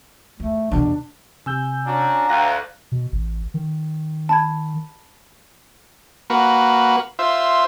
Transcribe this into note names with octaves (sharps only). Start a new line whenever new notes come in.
E2 A3
E2 B2 D4
C3 G#5 E6 G6
C#4 D4 F#4 A#5
D2 F5 G5 F#6 A#6
B2
A1
D#3
A5 B5 G#6
A#3 F#4 B4
F4 C5 E5